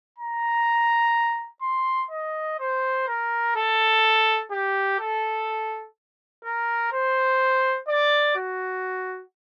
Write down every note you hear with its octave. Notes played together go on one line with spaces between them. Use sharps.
A#5
C6
D#5
C5
A#4
A4
G4
A4
A#4
C5
D5
F#4